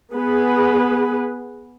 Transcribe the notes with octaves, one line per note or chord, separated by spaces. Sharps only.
B3 G#4 B4